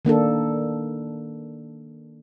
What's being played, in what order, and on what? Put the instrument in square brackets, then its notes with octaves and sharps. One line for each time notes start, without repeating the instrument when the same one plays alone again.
[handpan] D#3 A#3 D4 A4